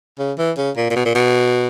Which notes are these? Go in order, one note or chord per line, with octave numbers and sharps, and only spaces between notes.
C#3
E3
C#3
A#2
A#2
B2
A#2
B2